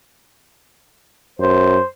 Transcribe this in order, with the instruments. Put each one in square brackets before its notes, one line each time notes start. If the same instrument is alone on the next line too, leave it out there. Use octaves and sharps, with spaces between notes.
[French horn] F#2 [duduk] C5